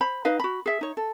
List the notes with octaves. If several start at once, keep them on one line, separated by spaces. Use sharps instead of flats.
C5 B5
D#4 B4 D#5 F5
F#4 B5
G#4 E5
D#4 C#5
A4